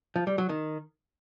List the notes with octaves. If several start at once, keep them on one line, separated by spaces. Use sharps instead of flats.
F3
G3
F#3
D#3